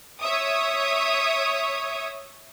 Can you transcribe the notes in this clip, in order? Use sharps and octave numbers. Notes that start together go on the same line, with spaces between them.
C#5 E5 D#6